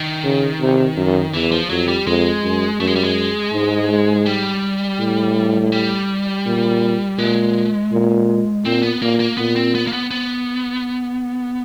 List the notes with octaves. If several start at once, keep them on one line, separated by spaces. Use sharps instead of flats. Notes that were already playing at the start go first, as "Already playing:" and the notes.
Already playing: D#3
C#3
C3
F#2
E2 E3
F3
F2 F#3
G3
F2 G#3
F#2
F#2 A3
G#3
G3
G#3
G#2
G3
A2
G3
A#2
A#2 G#3
A#2
A#2 C4
B3
A#2 A#3
A#3
A#2 B3
C4
B3
A#3
B3
B3